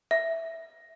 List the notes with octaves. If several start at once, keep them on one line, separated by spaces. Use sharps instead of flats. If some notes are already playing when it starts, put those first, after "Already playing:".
E5